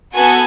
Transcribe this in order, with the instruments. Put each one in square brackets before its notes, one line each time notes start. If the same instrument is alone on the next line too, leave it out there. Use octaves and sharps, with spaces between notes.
[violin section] B3 F#4 A4 G#5